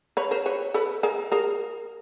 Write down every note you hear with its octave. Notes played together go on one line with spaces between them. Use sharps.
B4 C#5
A#4 C5
B4 C#5
A4 B4
G#4 A#4
G#4 A#4